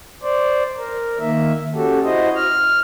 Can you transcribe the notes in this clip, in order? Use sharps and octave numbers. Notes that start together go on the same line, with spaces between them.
C5 D5
A#4
D#3 A#3 E5
C#4 F#4 G4 A4
E4 F#4 C5 D#5
F6